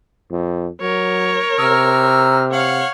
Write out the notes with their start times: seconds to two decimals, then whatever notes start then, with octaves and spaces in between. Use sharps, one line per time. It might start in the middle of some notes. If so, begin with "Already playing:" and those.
0.31 F2
0.81 F#3 A#4 C#5
1.59 C3 A#5 E6 F6
2.52 C#5 F5 F#5